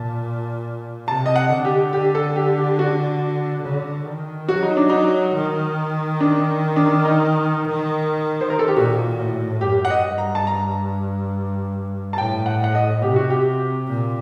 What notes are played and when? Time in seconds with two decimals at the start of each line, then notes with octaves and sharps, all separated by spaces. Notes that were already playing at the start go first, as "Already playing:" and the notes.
Already playing: A#2 A5
1.08 C3 A5
1.26 D#5
1.36 F#5
1.50 D3
1.65 G4
1.93 D3 G4
2.15 A4
2.36 G4
2.58 G4
2.79 F#4
3.63 D3
4.06 D#3
4.49 F#3 F#4
4.63 D#4
4.77 D4
4.90 F#3 D#4
5.35 D#3
6.20 D4
6.76 D4
7.05 D#4
8.41 C5
8.50 A#4
8.59 A4
8.68 G4
8.76 A#2 F#4
9.19 A2
9.61 F#2 G4
9.85 F#5
9.90 D#5
10.04 G2
10.18 A#5
10.35 A5
10.47 A#5
12.13 A5
12.18 A2 G5
12.46 F#5
12.64 F#5
12.75 D#5
13.02 C3 G4
13.16 F#4
13.30 G4
13.88 A#2